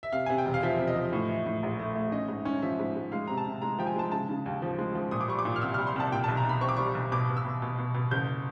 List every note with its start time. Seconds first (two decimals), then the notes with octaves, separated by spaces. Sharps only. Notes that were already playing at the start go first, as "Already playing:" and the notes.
0.03 E5
0.12 C3 F5
0.26 C3 G#5
0.38 G5
0.46 E1
0.54 F5
0.63 F3 E5
0.79 C3
0.87 D#5
0.96 F3
1.13 A2
1.29 E3
1.46 A2
1.63 A#1
1.79 A3
1.95 A3
2.12 C#4 D#5
2.28 G#2
2.45 C#4
2.62 F3 E5
2.80 G#2
2.96 G#2
3.12 G#3 F5
3.27 C3 A#5
3.37 A5
3.46 C3
3.62 G#3 A#5
3.79 F3 G5
3.87 G#5
3.96 G#3 A5
4.12 C#3 A5
4.29 C#3
4.46 D#2
4.62 F3
4.79 G#3
4.95 F3
5.11 A#2 D#6
5.21 D6
5.28 G3 C#6
5.39 D6
5.45 A#2
5.56 F6
5.62 C2 E6
5.74 F6
5.78 G3
5.87 C6
5.96 C2 A5
6.12 A#2 G5
6.24 A5
6.28 B1
6.37 A#5
6.44 B1 B5
6.61 C4 C#6
6.69 D6
6.76 G3 C#6
6.95 B1
7.12 B2 D6
7.29 B2
7.37 E6
7.45 B2
7.62 B2
7.78 B2
7.94 B2
8.11 F#1 G6